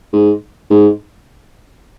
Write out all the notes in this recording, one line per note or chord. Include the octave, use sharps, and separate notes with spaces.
G#2
G#2